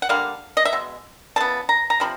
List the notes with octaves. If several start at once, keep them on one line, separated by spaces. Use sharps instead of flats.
F#5
D3 G3 A#3 F5
D#5
E5
B2 G#3
C#3 E3 B3 A5
A#5
A#5
C3 F3 B5